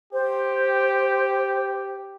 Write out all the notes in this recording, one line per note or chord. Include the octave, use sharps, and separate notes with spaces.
G4 C5